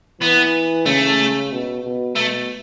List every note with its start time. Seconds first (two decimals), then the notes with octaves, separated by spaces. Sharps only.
0.21 E3 B3
0.86 C#3 A3
1.51 B2
1.84 B2
2.16 B2 A3